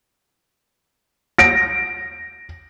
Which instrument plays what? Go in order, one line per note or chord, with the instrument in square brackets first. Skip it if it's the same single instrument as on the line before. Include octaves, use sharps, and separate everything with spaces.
[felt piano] A#6 D7